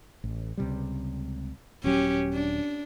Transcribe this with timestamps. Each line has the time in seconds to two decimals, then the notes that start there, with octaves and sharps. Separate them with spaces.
0.24 A1
0.57 C#2 C3 G3
1.84 D#1 F#3 C#4 G4
2.34 D4